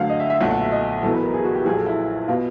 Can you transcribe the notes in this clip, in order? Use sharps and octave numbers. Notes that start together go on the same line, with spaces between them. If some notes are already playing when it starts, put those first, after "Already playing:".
Already playing: D2 D3 F#3 F5 F#5
D#5
E5
E5
B1 A#2 F#3 A3 F#5
F#5
E5
D#5
E2 B2 F#3 A4
B4
A#4
G#4
F#4
G4
A#1 A#2 F#3 G#4
A4
E4
B2 F4